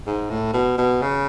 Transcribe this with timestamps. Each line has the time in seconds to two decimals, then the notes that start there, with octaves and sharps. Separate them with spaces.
0.07 G#2
0.30 A2
0.54 B2
0.78 B2
1.02 C#3